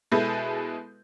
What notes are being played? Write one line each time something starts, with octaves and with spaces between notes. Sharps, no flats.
B2 G#3 E4 A4 B4 G6